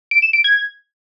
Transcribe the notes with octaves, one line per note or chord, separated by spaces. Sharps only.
D7
E7
D7
G#6